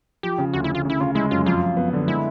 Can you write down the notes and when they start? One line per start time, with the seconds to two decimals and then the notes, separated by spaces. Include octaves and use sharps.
0.23 F3 G4
0.38 C#3
0.53 D2 F#4
0.64 E4
0.70 D2 F4
0.85 C#3 E4
1.00 C#3 F4
1.15 G#3 E4
1.31 F#2 F4
1.46 F2 F4
1.61 F2
1.77 B3
1.93 D3
2.08 G#3 E4